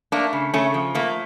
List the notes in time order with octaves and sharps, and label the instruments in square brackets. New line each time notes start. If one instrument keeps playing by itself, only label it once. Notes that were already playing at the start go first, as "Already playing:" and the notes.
[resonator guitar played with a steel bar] A3 A#3 D4
C#3
C#3 A3 C#4
F3
A3 A#3